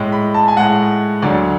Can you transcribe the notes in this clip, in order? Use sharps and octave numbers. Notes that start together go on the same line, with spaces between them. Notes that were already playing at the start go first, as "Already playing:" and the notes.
Already playing: A2 G#3
B5
A5
G#5
A2 G#3 F#5
D2 D3 F#3 D5